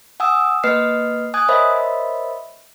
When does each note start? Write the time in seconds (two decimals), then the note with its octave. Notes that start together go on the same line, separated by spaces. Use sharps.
0.20 F#5 G#5 D#6 E6
0.64 A#3 B4 D#5 F6 C7
1.34 G#5 D#6 F#6 G#6
1.49 A#4 C5 C#5 D#5 E5 B5